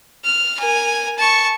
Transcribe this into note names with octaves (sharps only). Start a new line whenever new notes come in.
F6
A#4 G#5
A5 C#6